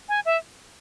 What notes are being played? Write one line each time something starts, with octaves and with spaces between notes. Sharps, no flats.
G#5
E5